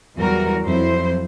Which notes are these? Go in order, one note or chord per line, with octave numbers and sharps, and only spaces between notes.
E2 E3 F#3 G3 F#4 A#4
F2 F#3 E4 C5